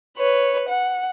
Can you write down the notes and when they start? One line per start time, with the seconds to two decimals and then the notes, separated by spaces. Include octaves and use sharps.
0.17 B4 C#5
0.69 F#5